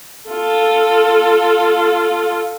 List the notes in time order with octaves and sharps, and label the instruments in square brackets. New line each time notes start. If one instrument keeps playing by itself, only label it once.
[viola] F4 A4